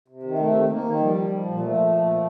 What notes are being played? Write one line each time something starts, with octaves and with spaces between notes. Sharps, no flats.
C3
D#3
C3 A3
D#3
D#3 A#3
D#3
F3 G3
F3
F3
A#2
F3 A3
F3
A#2
F3